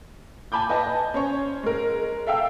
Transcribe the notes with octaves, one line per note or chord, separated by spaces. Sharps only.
G#5 A5 B5 D6 G6
B4 D#5 G#5 A5
C#4 C5 C#5
G#3 A#4
A4 E5 F5 G5 E6